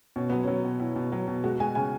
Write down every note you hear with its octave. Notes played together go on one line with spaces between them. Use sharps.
B2 C#4
F#3 B3
F#3 C#4
B2
B2 E4
B2
F#3
B2
G#3 F#4
G#3 G#5
C#3 G#5